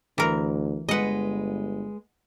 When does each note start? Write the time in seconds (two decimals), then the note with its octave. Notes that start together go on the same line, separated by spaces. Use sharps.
0.18 D2 E3 A#4
0.89 G1 G#3 B4 D#5 F#5